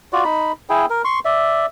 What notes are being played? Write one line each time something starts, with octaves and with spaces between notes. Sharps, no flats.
F4 F#4 D5
D#4 B5
E4 G#4 G5
A#4
C6 C#6
D5 E5